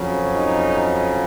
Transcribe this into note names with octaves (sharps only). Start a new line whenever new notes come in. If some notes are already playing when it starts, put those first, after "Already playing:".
Already playing: F2 C#3 F#3
D#4